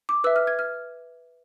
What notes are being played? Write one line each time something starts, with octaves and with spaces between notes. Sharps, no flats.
D6
B4 E5 E6
F6
G#6
F6